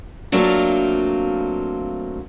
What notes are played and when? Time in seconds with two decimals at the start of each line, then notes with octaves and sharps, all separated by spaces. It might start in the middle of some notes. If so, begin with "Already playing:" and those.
0.32 F#3 A3 A#3 C4 D4 F4